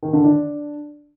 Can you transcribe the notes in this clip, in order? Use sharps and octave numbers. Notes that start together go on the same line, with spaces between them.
D#3
D3
D4